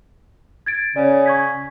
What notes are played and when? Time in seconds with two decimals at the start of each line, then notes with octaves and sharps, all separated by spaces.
0.66 G#6 A6 D7
0.96 C#3 C#5 D5
1.26 C#6 G#6 B6